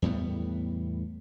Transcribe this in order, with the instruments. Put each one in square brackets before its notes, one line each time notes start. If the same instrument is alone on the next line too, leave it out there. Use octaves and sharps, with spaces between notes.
[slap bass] E2 A2 G3 B3